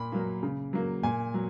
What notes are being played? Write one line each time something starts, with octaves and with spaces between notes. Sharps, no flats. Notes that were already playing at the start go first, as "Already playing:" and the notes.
Already playing: A#2 B5
F#3 A#3
C#3
F#3 A#3
A#2 G#5
F#3